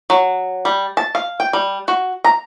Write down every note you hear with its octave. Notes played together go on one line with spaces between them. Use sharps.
F#3
G3
A5
F5
G5
G3
F#4
A#5